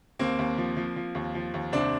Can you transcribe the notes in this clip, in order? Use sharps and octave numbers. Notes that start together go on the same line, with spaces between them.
D#2 A#3 C4
D#2
F3
F3
F3
D#2
F3
D#2
C2 C4 D4